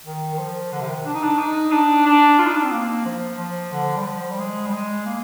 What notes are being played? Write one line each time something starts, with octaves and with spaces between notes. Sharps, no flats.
D#3
D#3
F3
D3
C3
D#3
D4
D#4
D4
D#4
D4
D4
F4
D#4
D4
C4
A#3
F3
F3
D3
G3
F3
G3
G#3
G3
G#3
A#3